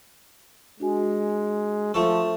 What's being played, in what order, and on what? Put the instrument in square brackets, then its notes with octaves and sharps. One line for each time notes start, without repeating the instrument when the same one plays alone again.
[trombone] G#3 [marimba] D4 F#4 G#5
[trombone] F3 [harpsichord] A3 A4 [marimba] F4 C#6